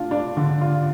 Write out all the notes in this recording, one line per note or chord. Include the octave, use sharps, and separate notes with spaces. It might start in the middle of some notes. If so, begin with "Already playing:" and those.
Already playing: A3 D4 F4
D4
D3
F4